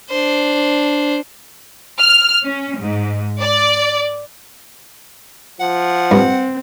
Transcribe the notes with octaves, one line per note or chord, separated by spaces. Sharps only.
D4 C5
F6
C#4
G#2
D5
F3 F#5
G2 C4